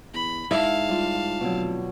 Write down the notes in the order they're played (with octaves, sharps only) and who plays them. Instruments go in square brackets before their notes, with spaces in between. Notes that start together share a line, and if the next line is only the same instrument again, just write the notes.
[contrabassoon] E2 [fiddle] B5
[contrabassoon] G#2 [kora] E4 [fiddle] F5 A5
[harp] G3 F4
[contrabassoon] F1 [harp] B2 D3 F#3